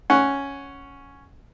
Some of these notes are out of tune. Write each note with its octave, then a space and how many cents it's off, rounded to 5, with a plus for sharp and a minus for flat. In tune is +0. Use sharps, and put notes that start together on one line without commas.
C#4 +0 F#5 +0